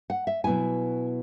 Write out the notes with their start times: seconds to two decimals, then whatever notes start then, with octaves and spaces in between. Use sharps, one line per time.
0.10 F#5
0.27 E5
0.44 B2 F#3 B3 E4 G#5